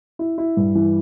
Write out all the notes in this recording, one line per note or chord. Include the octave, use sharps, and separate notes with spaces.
E4
E4
G2
E3